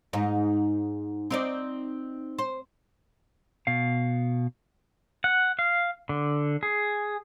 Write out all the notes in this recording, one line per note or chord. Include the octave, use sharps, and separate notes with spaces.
G#2 D#4
C4 D#4 D5
C5
B2 F5
F#5
F5
D3
G#4